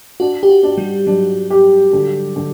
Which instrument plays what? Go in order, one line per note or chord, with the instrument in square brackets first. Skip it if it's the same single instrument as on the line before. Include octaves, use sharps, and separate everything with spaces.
[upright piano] D4 [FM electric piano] F#4
[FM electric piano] G4
F#4
[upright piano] D4
[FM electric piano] G3
[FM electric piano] F#3 [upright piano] D4
[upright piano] G4
D3
D3